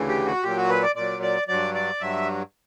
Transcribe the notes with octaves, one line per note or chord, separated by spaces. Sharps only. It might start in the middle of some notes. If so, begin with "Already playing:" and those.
Already playing: D2 C#3 E3
G4
F#4
A#2 F#3 G4
F#4
B4
D5
A#2 F#3 D5
D5
G2 F#3 D5
D5
G2 F#3 E5